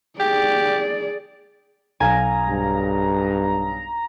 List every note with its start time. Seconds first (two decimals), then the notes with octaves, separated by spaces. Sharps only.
0.19 G4 G#4 D5
2.00 B1 F5 G#5 A#5
2.49 G2